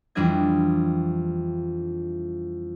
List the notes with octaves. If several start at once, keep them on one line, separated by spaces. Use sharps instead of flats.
F2 E3 G3 D4 D#5 G#6